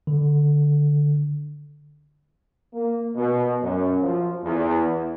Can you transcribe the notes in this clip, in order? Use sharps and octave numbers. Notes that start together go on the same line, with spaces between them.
D3
A#3
B2
F#2
F3
E2